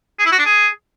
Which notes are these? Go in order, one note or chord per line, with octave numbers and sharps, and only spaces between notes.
G#4
E4
F#4
D4
G#4